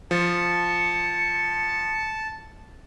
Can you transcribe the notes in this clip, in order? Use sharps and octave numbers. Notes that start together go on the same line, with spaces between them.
F3 A5 C#7